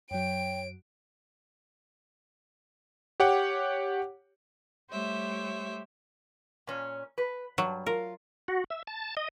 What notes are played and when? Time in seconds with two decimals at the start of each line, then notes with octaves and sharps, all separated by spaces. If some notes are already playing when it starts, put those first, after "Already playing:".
0.11 F#2 F#3 C#5 G5 D7
3.20 G4 C#5 F#5 G5 D6
4.90 G3 A3 G4 C5 C#5 E5
6.67 A#2 C#4
7.18 B4
7.58 G2 F#3
7.86 F4 A#4
8.48 F#4
8.70 E5
8.87 A5
9.17 D#5